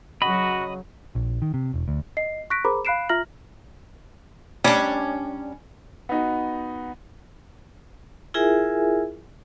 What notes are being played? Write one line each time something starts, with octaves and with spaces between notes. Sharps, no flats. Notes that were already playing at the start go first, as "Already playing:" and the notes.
C#3 F#3 F#4 D#5 B5
A#1
D#3
C3
E1
D2
D#5 C7
C#6 F#6 A#6 B6 D7
G#4 A#4 C5 A#5 B5 D6
F5 B5 F#6 C7 D7 E7
F4 E5 A#5 F6 A#6 F#7
G3 C#4 D4
B3 D#4 F#4
E4 F4 G#4 A#4 E5 G#5